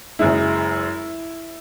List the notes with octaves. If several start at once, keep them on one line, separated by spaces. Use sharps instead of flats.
F#1 F#2 E3 G#3 E4